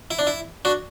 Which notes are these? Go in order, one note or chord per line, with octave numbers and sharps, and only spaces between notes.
E4
D4
E4
D4 F#4